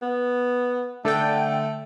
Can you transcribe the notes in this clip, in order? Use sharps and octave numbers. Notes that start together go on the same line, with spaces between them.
B3
D3 A3 A4 G5